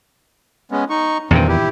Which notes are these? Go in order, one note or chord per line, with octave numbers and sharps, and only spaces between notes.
G#3 B3 C#4
D#4 C#6
E2 G2 A#2 D#3 C4
E4 G4